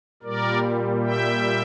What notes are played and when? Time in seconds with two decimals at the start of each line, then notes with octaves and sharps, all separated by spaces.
0.23 A#2 G3 A#4 D5
1.04 E5 G5